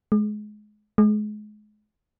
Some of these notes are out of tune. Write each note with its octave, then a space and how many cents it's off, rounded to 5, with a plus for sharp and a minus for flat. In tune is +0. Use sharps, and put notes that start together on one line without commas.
G#3 +25
G#3 +30